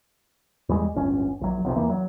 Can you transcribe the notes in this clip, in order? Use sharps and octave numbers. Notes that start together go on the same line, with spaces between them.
E2 G3 G#3
D1 G1 C#4
A#1 F#3
F1 B1 F2 C3
E2 E3 A#3
F#3